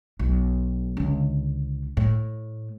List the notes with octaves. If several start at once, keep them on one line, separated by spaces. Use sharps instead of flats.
B1
C#2 D3
A2